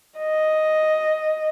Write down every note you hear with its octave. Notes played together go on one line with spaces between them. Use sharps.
D#5